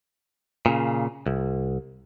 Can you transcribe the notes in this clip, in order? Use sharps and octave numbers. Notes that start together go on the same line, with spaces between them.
A#2 C#3
C2